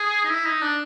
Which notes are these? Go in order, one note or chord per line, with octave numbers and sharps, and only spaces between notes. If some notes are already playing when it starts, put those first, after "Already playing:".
Already playing: G#4
D#4
E4
D#4
D4